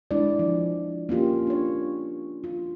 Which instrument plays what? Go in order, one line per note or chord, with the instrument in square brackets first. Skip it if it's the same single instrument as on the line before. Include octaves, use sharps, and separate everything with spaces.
[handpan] G#3 D4 E4 D5
F3
A#3 C#4 F4 G4
D4 C#5
F4